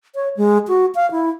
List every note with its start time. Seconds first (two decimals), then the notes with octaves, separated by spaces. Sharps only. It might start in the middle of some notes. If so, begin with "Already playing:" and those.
0.15 C#5
0.37 G#3
0.68 F#4
0.95 F5
1.11 E4